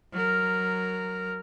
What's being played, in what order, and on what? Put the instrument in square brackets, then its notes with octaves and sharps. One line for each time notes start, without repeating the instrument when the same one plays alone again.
[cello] F#3 A#4 [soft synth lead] F6